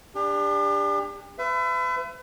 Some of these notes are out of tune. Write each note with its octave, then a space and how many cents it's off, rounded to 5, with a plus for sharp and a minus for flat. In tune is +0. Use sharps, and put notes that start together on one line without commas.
D4 +0 G4 +40
B4 +40 E5 +30